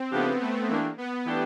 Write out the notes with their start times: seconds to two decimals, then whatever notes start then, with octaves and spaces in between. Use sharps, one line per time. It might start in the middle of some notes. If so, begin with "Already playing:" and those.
Already playing: C4
0.12 C#3 F3 A3 B3 D4 G4
0.40 A3
0.69 E3 A3 A#3 D4 G4
0.98 B3
1.26 E3 A3 D4 G4